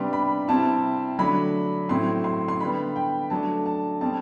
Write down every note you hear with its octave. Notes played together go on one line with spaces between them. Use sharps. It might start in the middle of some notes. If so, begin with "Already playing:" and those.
Already playing: C3 G3 B3 D4 C6
B5
C3 G3 C4 E4 A5
D3 F#3 A3 D4 B5
A2 F#3 C4 E4 C6
C6
C6
D3 G3 B3 B5
G5
F#3 A3 D4 A5
A5
B2 G3 C4 A5